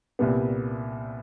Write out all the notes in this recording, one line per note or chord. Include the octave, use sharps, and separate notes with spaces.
C2 A#2 G3 B3